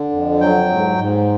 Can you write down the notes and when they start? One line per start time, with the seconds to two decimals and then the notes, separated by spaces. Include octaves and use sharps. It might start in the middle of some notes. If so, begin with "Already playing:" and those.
Already playing: D3
0.12 F2
0.41 F#3 G5
0.69 G#2
0.98 G#2